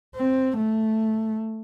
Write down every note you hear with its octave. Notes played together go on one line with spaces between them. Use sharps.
C4
A3